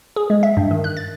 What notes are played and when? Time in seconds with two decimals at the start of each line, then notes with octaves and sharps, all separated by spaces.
0.16 G#4
0.30 G#3
0.43 E5
0.57 G2
0.71 D#3
0.84 F#6
0.97 A6